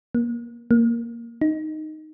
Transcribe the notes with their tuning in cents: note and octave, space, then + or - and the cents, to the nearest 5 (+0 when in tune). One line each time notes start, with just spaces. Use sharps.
A#3 +20
A#3 +0
D#4 -5